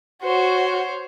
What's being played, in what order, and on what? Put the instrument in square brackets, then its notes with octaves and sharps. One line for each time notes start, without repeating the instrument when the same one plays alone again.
[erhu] F#4 [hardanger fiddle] C5 C#5